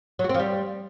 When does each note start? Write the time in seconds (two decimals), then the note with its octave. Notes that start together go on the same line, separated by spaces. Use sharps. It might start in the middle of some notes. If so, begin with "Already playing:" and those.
0.19 F#3
0.24 F#4
0.29 C4
0.34 F3
0.39 G3